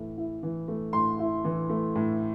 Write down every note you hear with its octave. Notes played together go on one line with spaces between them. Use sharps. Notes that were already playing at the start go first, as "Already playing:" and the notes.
Already playing: A2 E3 A3
E4
E3
A3
A2 C6
E4
E3
A3
A2